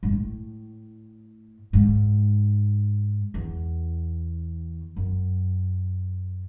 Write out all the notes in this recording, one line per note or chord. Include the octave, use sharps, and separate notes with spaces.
G#2
A2
G#2
E2
F#2